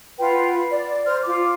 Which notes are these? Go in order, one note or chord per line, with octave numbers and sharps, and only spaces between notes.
F4 B4 F#5 G5
B5
D5
C5 F6
F4 D6